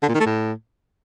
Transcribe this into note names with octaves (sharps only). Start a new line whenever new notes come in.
D3
A#2
D#3
A3
A2